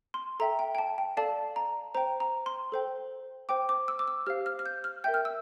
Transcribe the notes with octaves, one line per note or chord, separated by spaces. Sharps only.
C6
A4 E5 G5 A#5
G5
G5
A5
G5
A4 D5 F5 A5
A#5
C5 G5 A#5
A#5
C6
A4 C5 G5
C5 G5 D6
D6
E6
D6
E6
G4 C5 F5 F6
F6
F6
G6
F6
A#4 E5 G5 G6
F6
E6